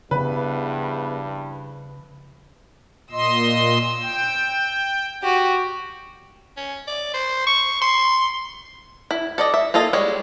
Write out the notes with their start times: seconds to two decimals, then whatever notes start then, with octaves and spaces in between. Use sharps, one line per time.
0.11 G2 C#3 F3 B3 E4 G#4 B4
3.12 A#2 D#5 C6 E6
4.02 G5
5.22 F#4 G4
6.57 C#4
6.87 D5
7.14 C5
7.47 C#6
7.82 C6
9.11 E4
9.38 A4 D5 D#5
9.54 E5
9.74 A#3 F4 A4 D#5
9.93 G3 G#3 C#5